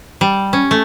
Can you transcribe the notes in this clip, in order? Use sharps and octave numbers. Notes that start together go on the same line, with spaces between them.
G3
C#4
A3